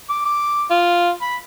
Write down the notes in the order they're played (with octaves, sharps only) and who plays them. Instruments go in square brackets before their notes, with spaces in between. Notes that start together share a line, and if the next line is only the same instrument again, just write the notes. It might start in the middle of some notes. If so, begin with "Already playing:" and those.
[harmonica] D6
D6
F4
B5